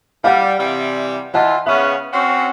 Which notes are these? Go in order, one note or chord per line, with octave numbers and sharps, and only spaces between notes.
G3 F5 F#5
C3 E3 G3
E3 F4 D#5 F#5 A5
C#3 B3 C#4 E5
C4 C#4 F#4